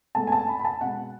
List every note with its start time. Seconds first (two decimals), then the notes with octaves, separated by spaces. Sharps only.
0.15 A2 G#3 B3 A5
0.27 G#5
0.32 A5
0.48 B5
0.59 B5
0.65 A5
0.81 B2 G#3 B3 F#5